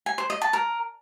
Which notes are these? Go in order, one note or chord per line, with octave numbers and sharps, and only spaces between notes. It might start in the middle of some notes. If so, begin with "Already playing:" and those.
G#5
C5
D#5
A5
A#4